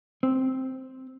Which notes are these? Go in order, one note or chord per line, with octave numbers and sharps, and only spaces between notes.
C4